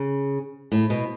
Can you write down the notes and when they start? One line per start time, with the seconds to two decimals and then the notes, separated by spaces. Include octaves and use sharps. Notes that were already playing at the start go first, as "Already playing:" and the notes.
Already playing: C#3
0.72 A2
0.90 B2